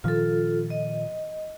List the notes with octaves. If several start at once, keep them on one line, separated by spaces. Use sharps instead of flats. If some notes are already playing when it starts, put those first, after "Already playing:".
A#2 D#3 F3 F4 A4
D#5